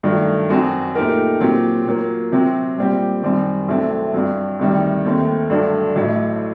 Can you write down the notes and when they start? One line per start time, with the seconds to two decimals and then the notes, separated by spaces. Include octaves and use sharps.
0.03 G2 D#3 F#3 A3
0.49 F#2 F#3 C4 F#4
0.95 A#2 A3 D#4 G4 A#4
1.40 A#2 F#3 C4 G4
1.86 A#2 F#3 A#3
2.32 C3 F#3 C4
2.78 A#2 G3 C4 G4
3.23 F#2 D#3 G3 C4
3.68 C2 C3 F#3 A3 C4
4.14 G2 F#3 C4
4.59 D2 C3 D#3 G3
5.05 D#2 D#3 A3 C4
5.50 G2 D3 F#3 A3
5.95 A1 A2 F#3 A3